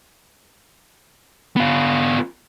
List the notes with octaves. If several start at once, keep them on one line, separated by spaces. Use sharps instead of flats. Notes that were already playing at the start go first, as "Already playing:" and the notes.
B3 F4